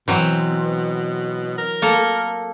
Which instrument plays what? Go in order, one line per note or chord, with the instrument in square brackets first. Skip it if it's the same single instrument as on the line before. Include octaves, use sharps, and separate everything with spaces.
[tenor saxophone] B2 [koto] E3 F#3 C4
[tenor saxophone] A#4
[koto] A#3 A4 A#5